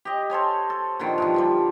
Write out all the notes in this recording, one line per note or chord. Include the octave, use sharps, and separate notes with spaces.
G4 D#5
A4 C5 C#5 G#5
A4
A#2 D3 D#3 F3
G2 E3 F3
D3 F3 G3